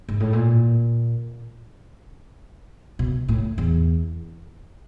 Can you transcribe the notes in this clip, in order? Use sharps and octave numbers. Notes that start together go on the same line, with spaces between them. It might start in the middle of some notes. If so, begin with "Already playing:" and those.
G#2
A2
A#2
B2
A2
E2